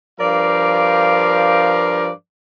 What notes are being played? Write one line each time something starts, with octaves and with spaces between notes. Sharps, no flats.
G2 F3 A#4 D5 F5